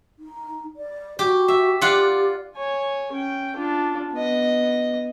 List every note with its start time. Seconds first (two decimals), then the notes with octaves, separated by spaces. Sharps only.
0.19 D#4
0.77 D5
1.19 F#4 G4
1.48 E5
1.81 F4 G4 D5 F#5
2.56 C#5 G#5
3.12 C#4 G5
3.56 D4 F4
4.13 B3 D#5